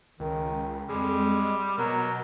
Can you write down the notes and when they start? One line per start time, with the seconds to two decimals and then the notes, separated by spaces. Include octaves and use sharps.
0.20 C#2 D#3
0.89 F2 G3 G#3
1.78 B2 F#3 A#4